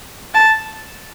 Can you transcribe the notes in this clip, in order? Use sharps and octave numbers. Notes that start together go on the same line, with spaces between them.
A5